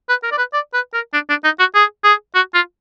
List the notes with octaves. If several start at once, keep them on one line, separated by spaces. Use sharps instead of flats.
B4
A#4
D5
B4
D5
B4
A#4
D4
D4
D#4
F#4
G#4
G#4
F#4
F4